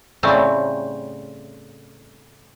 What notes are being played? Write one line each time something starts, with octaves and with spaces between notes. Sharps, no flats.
A2 C#3 G3 A3 C4